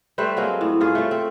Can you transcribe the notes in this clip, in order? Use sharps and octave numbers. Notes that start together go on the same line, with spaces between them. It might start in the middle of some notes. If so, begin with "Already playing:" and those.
G3 A3 B4 C5
F#3 G#3 A#3 C4
A2
G2 F4 G#4
A3 C#5
C4